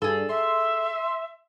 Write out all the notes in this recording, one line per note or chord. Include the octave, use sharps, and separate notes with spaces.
G2 G#4 A4
E5 C6